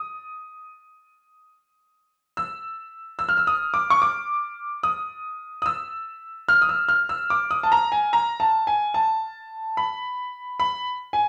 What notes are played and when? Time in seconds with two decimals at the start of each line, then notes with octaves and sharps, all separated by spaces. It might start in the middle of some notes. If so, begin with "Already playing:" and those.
Already playing: D#6
2.37 E6
3.19 E6
3.29 F6
3.37 E6
3.47 D#6
3.74 D6
3.90 C#6
4.02 D6
4.83 D#6
5.62 D#6
5.66 E6
6.49 F6
6.62 D#6
6.69 E6
6.89 F6
7.09 E6
7.30 D6
7.51 D#6
7.63 A5
7.72 A#5
7.92 G#5
8.13 A#5
8.40 A5
8.67 G#5
8.94 A5
9.77 B5
10.60 B5
11.13 G#5